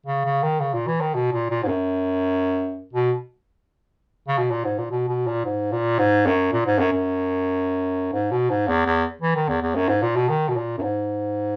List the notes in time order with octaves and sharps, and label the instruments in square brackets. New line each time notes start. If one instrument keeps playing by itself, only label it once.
[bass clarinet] C#3
C#3
D#3
C#3
A#2
E3
D#3
B2
A#2
A#2
G#2
F#2
B2
C#3
B2
A#2
G#2
A#2
B2
B2
A#2
G#2
A#2
G#2
F#2
A#2
G#2
F#2
F#2
G#2
B2
G#2
E2
E2
E3
D#3
E2
E2
F#2
G#2
A#2
B2
D#3
B2
A#2
F#2
G#2